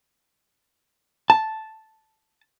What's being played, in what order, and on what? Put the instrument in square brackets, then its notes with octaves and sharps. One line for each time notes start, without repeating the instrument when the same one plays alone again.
[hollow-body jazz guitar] A5